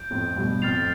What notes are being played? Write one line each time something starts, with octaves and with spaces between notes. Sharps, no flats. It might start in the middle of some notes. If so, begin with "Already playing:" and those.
Already playing: G6 D7
F2 A2
G2 B2
F2 A2 F6 A6 C7 F7